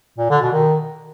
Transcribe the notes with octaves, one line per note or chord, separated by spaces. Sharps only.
A#2
D3
B2
D#3